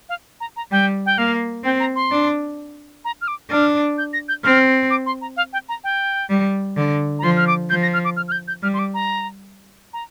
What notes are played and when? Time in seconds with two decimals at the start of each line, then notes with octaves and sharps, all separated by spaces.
0.09 F5
0.40 A#5
0.56 A#5
0.72 G3 G5
1.06 G5
1.18 A#3 F5
1.64 C4 G5
1.80 A#5
1.96 C6
2.11 D4
3.05 A#5
3.21 F6
3.28 D6
3.51 D4 F6
3.98 G6
4.13 A#6
4.28 G6
4.44 C4 F6
4.90 D6
5.06 C6
5.21 A#5
5.37 F5
5.53 G5
5.69 A#5
5.84 G5
6.30 G3
6.77 D3
7.19 A#5
7.23 F3 C6
7.37 F6
7.47 D6
7.70 F3 G6
7.82 A#6
7.93 F6
8.05 D6
8.17 F6
8.28 F6
8.32 G6
8.48 G6
8.63 G3 F6
8.74 C6
8.79 D6
8.94 A#5
9.93 A#5